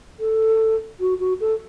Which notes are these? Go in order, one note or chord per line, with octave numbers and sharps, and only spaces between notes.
A4
F#4
F#4
A4